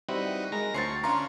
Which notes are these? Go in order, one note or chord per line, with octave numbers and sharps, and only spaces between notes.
G3 C4 D#4 E4 F#4 B4
G#3 A#4 A#5
D2 F3 F#3 C4 C#5 A6 C7
D3 C#4 D4 F4 A#5 C6